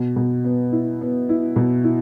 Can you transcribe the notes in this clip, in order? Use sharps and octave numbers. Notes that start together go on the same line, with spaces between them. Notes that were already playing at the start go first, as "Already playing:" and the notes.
Already playing: B2
B2
B3
E4
B3
E4
B2
E4